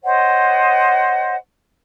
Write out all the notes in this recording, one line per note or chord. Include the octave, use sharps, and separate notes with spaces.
C5 C#5 D#5 F#5